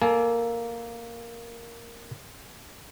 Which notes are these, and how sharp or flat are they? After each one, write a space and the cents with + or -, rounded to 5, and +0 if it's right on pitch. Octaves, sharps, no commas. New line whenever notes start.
A#3 +0 A4 +0 G#5 +35